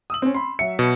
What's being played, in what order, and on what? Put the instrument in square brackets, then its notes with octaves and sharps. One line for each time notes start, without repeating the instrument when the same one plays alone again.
[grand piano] D#6 E6 F#7
C4 C#4
B5 C6
[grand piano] F#3 E5 [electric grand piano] C#7
[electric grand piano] B2